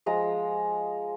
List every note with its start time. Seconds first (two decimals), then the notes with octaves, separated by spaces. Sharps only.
0.06 F3 G#3 A#5